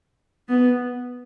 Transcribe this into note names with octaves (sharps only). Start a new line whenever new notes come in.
B3